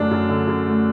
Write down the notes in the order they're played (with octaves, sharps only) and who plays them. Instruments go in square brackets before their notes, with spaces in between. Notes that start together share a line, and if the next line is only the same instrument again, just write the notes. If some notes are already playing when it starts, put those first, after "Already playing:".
Already playing: [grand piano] F#2 D3 A3 [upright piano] D4
[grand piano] F#2
D3
F#2
A3